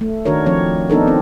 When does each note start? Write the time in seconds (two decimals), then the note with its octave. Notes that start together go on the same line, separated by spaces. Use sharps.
0.01 A3
0.25 D#3 D4 F#4 A#4 C#5
0.46 F3 C4 C#5
0.90 B3 D4 D#4 A4 A#4
1.08 C4